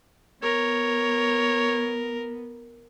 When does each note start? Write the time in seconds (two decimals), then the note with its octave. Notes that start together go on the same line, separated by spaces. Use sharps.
0.43 B3 A#4 C#5